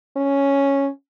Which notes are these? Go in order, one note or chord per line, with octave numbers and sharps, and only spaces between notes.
C#4